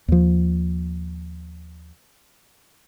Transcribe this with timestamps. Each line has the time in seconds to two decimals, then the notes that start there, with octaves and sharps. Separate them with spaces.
0.08 D#2 F3